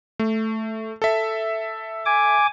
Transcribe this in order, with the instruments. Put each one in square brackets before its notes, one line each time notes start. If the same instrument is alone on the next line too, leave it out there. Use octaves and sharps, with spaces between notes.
[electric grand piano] A3
A4 E5
[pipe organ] G#5 D6